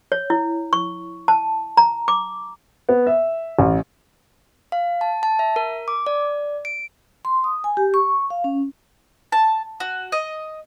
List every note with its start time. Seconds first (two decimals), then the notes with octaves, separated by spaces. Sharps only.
0.12 C#5
0.30 E4
0.73 C#6
1.28 A5
1.77 A#5
2.08 D6
2.89 B3
3.07 E5
3.59 A1
4.72 F5
5.01 A5
5.23 A5
5.39 E5
5.56 A#4
5.88 D6
6.07 D5
6.65 D7
7.25 C6
7.44 D#6
7.64 G#5
7.77 G4
7.94 C#6
8.30 F5
8.44 C#4
9.32 A5
9.80 F#4
10.12 D#5